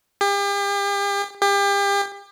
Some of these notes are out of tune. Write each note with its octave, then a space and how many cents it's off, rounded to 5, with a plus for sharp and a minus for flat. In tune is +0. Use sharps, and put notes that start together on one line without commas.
G4 +40
G4 +35